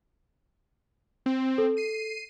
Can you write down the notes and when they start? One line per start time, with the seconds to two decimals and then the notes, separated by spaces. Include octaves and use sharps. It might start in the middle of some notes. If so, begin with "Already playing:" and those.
1.26 C4
1.58 A4
1.77 C7 D#7